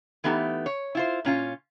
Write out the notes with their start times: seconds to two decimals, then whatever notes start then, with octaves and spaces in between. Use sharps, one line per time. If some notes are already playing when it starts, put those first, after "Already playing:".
0.24 E3 A3 B3 D#4 G4
0.66 C#5
0.95 E4 F4 C5
1.25 A#2 C#4 F4